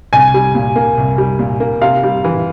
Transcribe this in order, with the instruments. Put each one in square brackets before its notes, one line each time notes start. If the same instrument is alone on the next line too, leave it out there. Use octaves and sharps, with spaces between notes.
[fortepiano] C2 [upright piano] G#5
[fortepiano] G3
A#2
A#3
C2
G3
A#2
A#3
[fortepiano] C3 [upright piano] F5
[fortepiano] G3
E3